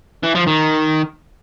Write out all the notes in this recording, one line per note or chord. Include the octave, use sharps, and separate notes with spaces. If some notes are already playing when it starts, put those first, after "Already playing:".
E3
F3
D#3